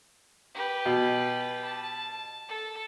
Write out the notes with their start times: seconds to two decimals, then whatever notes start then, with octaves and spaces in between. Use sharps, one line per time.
0.55 G4 B4
0.86 B2
1.65 A5
2.49 A4